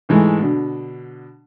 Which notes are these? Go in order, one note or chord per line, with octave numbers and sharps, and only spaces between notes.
G#2 E3 G#3 A3
B2 D3